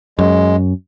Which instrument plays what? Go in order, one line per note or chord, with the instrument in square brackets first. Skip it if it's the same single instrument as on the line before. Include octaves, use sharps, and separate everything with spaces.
[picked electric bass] F#2 [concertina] G#3